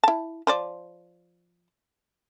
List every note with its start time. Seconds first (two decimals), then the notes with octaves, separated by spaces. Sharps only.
0.04 E4 A5
0.47 F3 C5 D5